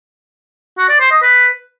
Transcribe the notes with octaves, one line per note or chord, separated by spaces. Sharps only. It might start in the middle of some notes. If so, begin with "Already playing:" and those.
F#4
D5
C5
D#5
B4